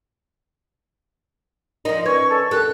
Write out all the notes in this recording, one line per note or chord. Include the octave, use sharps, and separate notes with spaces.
F3 C4 D#4 A#4 D#5
C#4 B4 C#6 G#6
A4
D#2 G4 A4 A#4 F#6